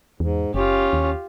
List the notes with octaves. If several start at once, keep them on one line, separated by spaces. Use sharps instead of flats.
E2 G#2
F#1 C#4 F4 G4
D#2